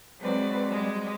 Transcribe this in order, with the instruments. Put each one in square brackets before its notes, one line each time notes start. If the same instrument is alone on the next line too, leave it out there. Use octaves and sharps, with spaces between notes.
[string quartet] F#3 G#3 C4 F#4 B4 D5
G3 G#3